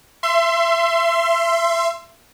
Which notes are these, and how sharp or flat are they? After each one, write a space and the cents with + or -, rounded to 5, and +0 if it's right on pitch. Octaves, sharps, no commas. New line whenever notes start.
E5 +30 C6 +0